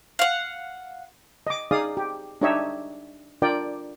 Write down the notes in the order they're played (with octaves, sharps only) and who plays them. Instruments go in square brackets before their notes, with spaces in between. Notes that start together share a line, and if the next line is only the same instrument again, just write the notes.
[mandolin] F5 F#5
[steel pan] D#5 D6
D#4 G#4 D5 F5 D#6
G4
D4 D#4 G4 C#5 D#5 E5
D4 F4 A#4 D5 G5